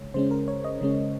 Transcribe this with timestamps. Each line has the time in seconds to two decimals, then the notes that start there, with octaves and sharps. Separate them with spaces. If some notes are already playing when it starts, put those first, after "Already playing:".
Already playing: C#3 G#3 C#5
0.14 C#3 G#3 C#4 C5
0.31 A#4
0.48 C#5
0.64 D#5
0.81 C#3 G#3 C#4